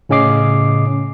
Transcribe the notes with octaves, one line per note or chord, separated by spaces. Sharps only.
A2 C#3 C#4 D#5 D6 C7